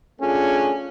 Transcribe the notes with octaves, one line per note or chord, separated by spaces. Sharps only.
A3 C#4 D4 F4 G#4